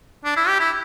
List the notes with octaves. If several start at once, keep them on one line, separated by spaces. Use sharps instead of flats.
D4
E4
G4
E4